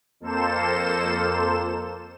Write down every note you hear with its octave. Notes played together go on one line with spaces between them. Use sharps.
F2 A#3 A4 C5 E7